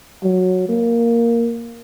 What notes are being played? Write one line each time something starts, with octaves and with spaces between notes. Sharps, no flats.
F#3
A#3